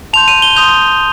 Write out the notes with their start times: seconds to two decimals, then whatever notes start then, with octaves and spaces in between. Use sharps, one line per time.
0.13 A5 C6 G6 F7
0.28 D#7
0.42 G7
0.56 C6 D#6 G6 F7